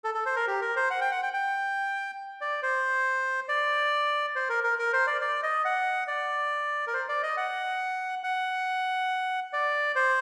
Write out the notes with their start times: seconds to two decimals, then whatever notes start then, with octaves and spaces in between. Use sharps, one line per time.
0.04 A4
0.15 A4
0.26 C5
0.36 A#4
0.47 G4
0.61 A#4
0.76 C5
0.90 F#5
1.01 G5
1.11 F#5
1.23 G5
1.34 G5
2.41 D5
2.63 C5
3.49 D5
4.36 C5
4.49 A#4
4.64 A#4
4.79 A#4
4.93 C5
5.07 D5
5.21 D5
5.43 D#5
5.65 F#5
6.07 D5
6.87 A#4
6.93 C5
7.09 D5
7.23 D#5
7.37 F#5
8.23 F#5
9.53 D5
9.96 C5